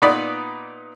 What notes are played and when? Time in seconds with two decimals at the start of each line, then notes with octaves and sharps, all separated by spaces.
0.02 A#2 B3 D#4 B4 D5 B5